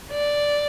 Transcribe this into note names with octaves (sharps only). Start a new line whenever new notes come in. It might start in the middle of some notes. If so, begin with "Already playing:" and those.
D5